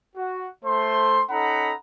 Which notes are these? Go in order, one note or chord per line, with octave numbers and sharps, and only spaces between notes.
F#4
A3 C5 C6
C#4 D#4 A4 F#5 A#5 B5